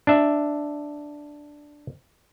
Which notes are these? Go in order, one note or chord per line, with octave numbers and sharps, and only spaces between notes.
D4 E5